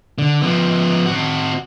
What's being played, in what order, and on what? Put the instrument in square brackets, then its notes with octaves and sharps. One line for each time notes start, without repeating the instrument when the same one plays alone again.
[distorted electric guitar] D3
F3 B3
C4 F#4